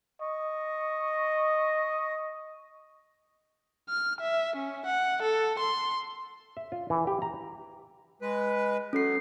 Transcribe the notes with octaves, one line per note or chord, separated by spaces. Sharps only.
D#5 C#6
F6
E5
C#4
F#5
A4
C6
E5
F4
E3
G4
A#5
G#3 B4
F#3 C#4 A4 C7